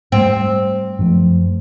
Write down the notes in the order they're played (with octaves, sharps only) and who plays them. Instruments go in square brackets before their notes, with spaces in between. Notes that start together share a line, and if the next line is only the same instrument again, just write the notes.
[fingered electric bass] G#2 G3 A3 [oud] C4
[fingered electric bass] F#2 F3 A3